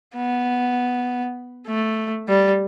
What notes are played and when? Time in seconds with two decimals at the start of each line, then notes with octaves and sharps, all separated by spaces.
0.16 B3
1.67 A3
2.28 G3